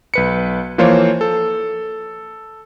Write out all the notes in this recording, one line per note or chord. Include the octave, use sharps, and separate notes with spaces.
B1 B4 C#7
E3 F3 A#3 F4 C5 C#5
A4